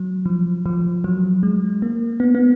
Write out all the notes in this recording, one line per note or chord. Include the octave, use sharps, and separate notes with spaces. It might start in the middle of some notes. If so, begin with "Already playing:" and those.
Already playing: F#3
F3
F3
F#3
G#3
A#3
B3
B3